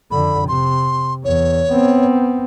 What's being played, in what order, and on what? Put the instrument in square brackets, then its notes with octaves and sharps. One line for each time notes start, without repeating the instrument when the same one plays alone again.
[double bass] F2 D3 [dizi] B5
[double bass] C3 [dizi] C6
[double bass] E2 [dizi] C#5
[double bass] B3 C4